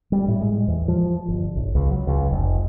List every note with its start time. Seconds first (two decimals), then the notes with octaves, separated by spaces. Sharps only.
0.12 G3
0.28 A2
0.41 G#3
0.68 E2
0.88 F3
1.28 G1
1.56 B1
1.75 C#2
1.91 F#3
2.07 C#2
2.30 F1